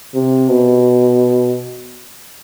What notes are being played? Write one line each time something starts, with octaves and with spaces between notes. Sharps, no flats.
C3
B2